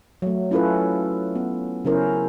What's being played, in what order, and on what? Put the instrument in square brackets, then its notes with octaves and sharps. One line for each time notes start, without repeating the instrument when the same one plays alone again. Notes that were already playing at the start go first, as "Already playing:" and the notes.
[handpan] F#3 A3
C#4 E4 F4 A4 B4
B3
C#3 F#3 C#4 E4 A#4 C5